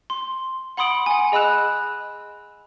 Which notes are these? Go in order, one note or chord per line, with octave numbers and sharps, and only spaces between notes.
C6
F#5 B5 C6 D#6 D7 F#7
F#5 G#5
G#4 D#5 B5 E6 F#6 E7